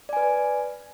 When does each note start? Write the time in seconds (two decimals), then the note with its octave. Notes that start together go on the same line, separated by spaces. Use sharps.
0.09 D5
0.13 G#5
0.17 B4